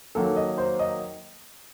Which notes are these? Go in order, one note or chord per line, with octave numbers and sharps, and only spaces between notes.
D#3 F#3 A#3 A4
D#5
C5
D#5